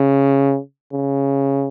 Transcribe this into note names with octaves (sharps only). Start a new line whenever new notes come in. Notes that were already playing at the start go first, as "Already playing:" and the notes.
Already playing: C#3
C#3